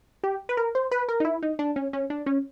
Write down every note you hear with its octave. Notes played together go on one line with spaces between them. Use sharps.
G4
B4
A#4
C5
B4
A#4
D#4
E4
D#4
D4
C#4
C#4
D4
C#4